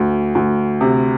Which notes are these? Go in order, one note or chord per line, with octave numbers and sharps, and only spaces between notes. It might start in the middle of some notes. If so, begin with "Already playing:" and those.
Already playing: D2
D2
C3